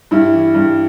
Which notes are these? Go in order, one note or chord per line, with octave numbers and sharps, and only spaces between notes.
G2 E4
E3
G2